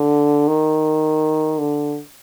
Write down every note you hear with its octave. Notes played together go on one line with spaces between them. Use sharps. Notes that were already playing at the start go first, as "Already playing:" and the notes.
Already playing: D3
D#3
D3